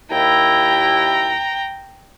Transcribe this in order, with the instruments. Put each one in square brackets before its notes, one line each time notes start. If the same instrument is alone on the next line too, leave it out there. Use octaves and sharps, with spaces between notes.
[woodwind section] D#2 E4 [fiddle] G5 A#5